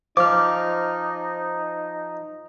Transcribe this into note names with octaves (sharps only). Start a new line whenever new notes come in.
F3 D#4 C5 D6 F6